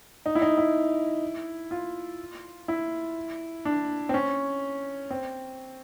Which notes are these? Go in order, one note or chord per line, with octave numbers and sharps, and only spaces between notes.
D#4
E4
D#4
E4
F4
E4
D4
C4
C#4
C4